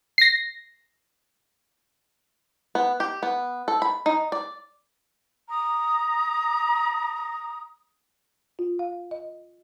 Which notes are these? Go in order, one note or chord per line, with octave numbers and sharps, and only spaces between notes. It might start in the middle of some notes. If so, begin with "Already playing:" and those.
A#6 C7
B3
G4
B3
A4
B5
D#4
D5
A#5 D#6
F4
F5
D#5